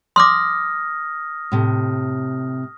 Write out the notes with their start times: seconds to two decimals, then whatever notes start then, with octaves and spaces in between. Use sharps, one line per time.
0.16 C6 D6 D#6 F6 A#6
1.52 A2 C3